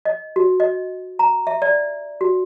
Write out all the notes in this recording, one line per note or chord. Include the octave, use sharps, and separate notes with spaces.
D#5
F#4
D#5
A#5
E5
D5
F#4